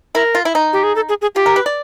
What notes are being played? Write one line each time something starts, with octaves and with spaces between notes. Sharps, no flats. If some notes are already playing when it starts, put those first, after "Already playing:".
E4 A#4
F4
E4
D#4
G4
G#4
A4
G#4
G#4
F4 G4
A#4
B4
D5